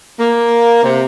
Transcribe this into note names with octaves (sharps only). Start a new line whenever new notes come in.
A#3
C3